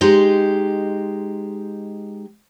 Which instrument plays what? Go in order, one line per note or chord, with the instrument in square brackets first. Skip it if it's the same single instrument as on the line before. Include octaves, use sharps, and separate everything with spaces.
[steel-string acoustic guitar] G#3 D#4 G4 C5